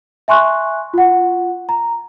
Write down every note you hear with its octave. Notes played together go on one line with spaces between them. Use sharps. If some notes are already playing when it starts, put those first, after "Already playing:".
E5 G#5 C6 C#6 F#6
F4 F#5
A#5